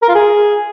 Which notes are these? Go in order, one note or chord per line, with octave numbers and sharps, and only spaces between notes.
A#4
F4
G#4